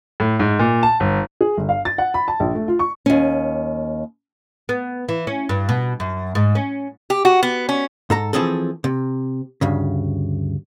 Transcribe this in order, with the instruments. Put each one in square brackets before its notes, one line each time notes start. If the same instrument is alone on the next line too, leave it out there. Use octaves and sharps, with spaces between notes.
[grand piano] A2
G#2
A#2
A5
G1
[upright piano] G#4
G1
F5
A6
F#5
B5
A5
A#1
A3
F4
C#6
[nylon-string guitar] D#2 C#4
[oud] B3
E3
C#4
G2
B2
F#2
G#2
C#4
[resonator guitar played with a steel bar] G4
F#4
B3
C#4
[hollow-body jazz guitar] G#2 A4 A#5
E3 F3 C4 G#4 A4
C3
D2 G2 C#3